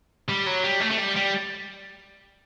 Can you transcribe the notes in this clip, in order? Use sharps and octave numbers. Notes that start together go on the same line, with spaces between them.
G3
F#3
G3
A3
A3
G3
G3